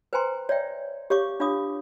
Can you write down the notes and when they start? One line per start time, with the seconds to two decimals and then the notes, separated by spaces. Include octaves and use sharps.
0.13 B4 C5 G5 G#5 A#5 C6
0.49 C#5 D5 E5 G5
1.10 G4 C#5 F5 C#6 D6
1.40 D4 F4 C#5 F5 D6 D#6